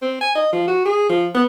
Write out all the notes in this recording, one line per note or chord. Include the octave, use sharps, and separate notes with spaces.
C4
G#5
D#5
F3
F#4
G#4
F3
B3